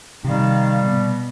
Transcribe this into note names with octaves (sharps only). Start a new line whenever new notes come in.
C3 D#3 G3 F5
B2